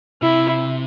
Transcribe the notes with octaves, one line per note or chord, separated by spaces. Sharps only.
C3 E4